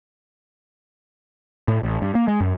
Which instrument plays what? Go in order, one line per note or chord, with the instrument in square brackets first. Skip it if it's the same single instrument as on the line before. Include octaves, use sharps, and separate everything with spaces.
[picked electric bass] A2
A1
G2
A#3
G#3
F#2